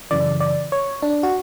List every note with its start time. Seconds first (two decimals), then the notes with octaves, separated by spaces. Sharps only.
0.11 F#2 C#3 E3 D5
0.40 D5
0.72 C#5
1.02 D4
1.23 F#4